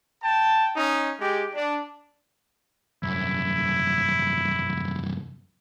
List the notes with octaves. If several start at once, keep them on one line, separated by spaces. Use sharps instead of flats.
G5 A5
C#4 D#4
G#3 G4
D4
C2 F#2 E4